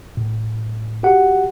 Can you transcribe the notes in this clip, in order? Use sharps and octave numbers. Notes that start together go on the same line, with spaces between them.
A2
F#4 G4 F#5